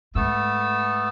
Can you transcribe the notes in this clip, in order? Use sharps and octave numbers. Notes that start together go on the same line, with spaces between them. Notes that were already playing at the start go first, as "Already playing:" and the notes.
G#2 A3 B3 E6